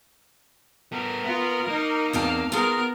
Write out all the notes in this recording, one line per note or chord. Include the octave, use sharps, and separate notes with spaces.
B3 A4 A#4
B3 F4
A#3 D#4
E2 C4 F5 A5
B3 F4 G#4 A#4